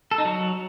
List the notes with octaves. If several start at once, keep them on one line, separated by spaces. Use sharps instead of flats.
A4
D#4
F#3